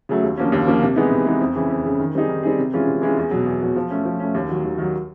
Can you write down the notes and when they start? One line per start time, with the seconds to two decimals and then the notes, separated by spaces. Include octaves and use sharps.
0.09 C#3 F#3 A3
0.23 D#2
0.37 D3 F3 A#3 C#4
0.52 D#2
0.67 D3 F3 A#3 C#4
0.82 C3
0.96 E3 G#3 B3 D#4
1.11 C3
1.26 E3 G#3 B3 D#4
1.41 F2
1.55 C#3 E3
1.70 F2
1.85 C#3 E3
2.00 D#3
2.15 G3 C4 D#4 G#4
2.29 D#3
2.43 G3 C4 D#4 G#4
2.59 C3
2.73 E3 G#3 C#4 F4
2.87 C3
3.02 E3 G#3 C#4 F4
3.17 E2
3.31 B2 F#3
3.46 E2
3.62 B2 F#3
3.76 F3
3.90 A3 C#4
4.05 F3
4.20 A3 C#4
4.34 D#2
4.49 D#3 F#3
4.64 D#2
4.78 D#3 F#3